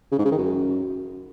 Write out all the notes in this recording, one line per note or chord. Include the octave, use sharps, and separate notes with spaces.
C#3
G#2
C#3
D#3
F#2